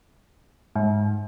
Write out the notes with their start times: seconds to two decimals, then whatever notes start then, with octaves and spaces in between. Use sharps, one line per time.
0.76 G#2